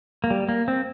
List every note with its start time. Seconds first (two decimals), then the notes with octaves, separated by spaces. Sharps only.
0.24 A#3
0.30 G3
0.49 A#3
0.68 C4